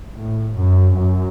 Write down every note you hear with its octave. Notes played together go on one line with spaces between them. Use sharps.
A2
F#2
F#2